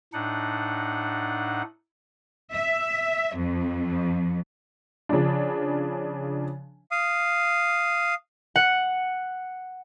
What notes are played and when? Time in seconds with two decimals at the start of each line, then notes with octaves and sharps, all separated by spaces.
0.13 A2 D4 D#4 F#5
2.53 E5
3.36 F2
5.09 C#3 F3 D4
6.91 F5 D#6
8.56 F#5